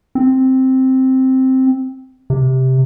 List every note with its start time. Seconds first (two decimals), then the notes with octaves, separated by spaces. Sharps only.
0.15 C4
2.30 C3